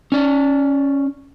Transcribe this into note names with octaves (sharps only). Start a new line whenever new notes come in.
C#4 D5